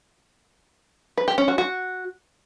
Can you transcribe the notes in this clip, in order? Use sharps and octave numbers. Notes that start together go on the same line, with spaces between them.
B4
G4
C#4
F#4
F#4